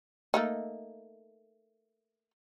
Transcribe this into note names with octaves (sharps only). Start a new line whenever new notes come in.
A3 A#3 D#4